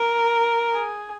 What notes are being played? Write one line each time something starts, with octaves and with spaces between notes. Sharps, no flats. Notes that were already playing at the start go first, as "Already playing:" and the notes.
Already playing: A#4
G#4